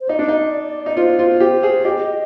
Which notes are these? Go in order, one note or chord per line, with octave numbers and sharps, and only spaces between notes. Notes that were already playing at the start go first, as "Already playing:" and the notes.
C5
D#4 D5
D4
D#4
D#4
F4 C5
F4
G4
G#4
G4 D#5